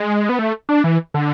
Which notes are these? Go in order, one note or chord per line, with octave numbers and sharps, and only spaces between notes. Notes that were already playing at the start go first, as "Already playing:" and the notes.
Already playing: G#3
B3
A3
D4
E3
D3